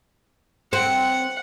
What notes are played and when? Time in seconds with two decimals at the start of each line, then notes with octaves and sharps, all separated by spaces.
0.73 C4 F#5